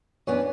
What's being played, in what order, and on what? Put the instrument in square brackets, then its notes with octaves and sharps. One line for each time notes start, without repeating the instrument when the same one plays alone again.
[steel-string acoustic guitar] F#2 E3 B3 D4 [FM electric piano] C#5